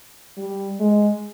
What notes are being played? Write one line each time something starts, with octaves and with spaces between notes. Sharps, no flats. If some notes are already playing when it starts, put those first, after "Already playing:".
G3
G#3